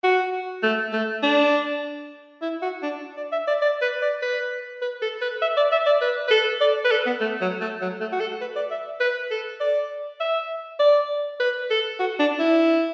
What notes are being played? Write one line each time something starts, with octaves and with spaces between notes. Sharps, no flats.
F#4
A3
A3
D4
E4
F#4
D4
D5
E5
D5
D5
B4
D5
B4
B4
A4
B4
E5
D5
E5
D5
B4
B4
A4
D5
B4
A4
B3
A3
F#3
A3
F#3
A3
F#4
A4
B4
D5
E5
B4
A4
D5
E5
D5
B4
A4
F#4
D4
E4